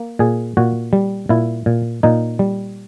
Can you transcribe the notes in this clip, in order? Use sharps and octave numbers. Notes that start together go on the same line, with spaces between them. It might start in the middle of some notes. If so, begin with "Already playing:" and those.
Already playing: A#3
A#2 G#4
A#2 F#4
G3
A#2 E4
A#2
A#2 D#4
G3